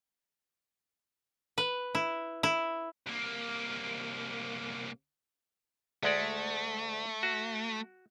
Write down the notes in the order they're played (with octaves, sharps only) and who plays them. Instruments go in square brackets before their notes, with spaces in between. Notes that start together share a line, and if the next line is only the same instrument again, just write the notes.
[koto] B4
E4
E4
[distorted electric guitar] C2 A#3
[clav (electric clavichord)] D2 G#3 D5 [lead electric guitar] A3
[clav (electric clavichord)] F#4